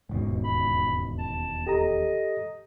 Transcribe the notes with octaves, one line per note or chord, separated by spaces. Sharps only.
E1 D#2 G#2 B2
B5
A5
G4 A4 D#5 A#5